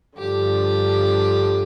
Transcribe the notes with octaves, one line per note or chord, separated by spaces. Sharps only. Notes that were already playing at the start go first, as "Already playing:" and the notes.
G2 D3 F3 G4